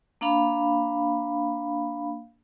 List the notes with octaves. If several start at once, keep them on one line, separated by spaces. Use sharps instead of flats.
A#3 D4 F5 B5